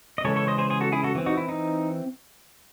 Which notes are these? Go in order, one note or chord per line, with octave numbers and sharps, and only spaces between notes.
D#5
C#3 E3 G#3 C#4 A4 C#5
A4 C#5
C5 D#5
G#4 C5
G#4 C5
F#4 A4
E4 G#4
F#4 A4
E3 C4
D#4 F#4
E4
D#4